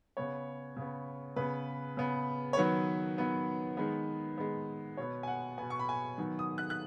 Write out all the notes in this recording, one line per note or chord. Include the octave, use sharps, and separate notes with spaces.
C#3 B3 C#5
C#3 B3
C#3 B3 B4
C#3 B3
C#5
D#3 F#3 B3 B4
D#3 F#3 B3
D#3 G#3 B3
D#3 G#3 B3
B2 B3 C#5
G#5
F#5
B2 B3 G#5
C#6
B5
G#5
D#3 F#3 B3
D#6
F#6
F#6